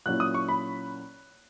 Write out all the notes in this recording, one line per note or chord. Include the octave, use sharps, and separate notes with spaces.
A#2 F#3 C#4 E4 F#6
D#6
C#6
B5